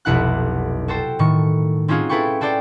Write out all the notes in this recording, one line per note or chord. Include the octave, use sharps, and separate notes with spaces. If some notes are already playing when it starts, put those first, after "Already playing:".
F1 B1 E4 F#5 F#6
F#4 A4 C5 G5
A2 D#3 C#6
C4 C#4 D#4 F4 F#4 G#4
E4 G#4 A4 B4 G5 C#6
F#4 A4 C5 D5 G5